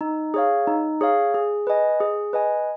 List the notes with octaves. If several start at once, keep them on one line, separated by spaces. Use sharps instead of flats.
D#4
G#4 C#5 F5
D#4
G#4 C#5 F5
G#4
B4 D#5 G#5
G#4
B4 D#5 G#5